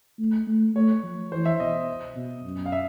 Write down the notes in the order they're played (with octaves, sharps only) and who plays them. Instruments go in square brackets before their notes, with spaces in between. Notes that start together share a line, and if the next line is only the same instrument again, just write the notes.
[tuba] A3
A3
[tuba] A3 [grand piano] C#5
[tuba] F3
[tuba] E3 [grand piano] C5
[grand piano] E5
[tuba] B2 [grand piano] D#5
[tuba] B2
F#2
[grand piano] F5
E5